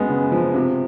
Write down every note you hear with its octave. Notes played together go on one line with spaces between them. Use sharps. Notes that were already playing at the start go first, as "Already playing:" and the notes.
Already playing: F#2 G#3 B3
C#3
F3
C3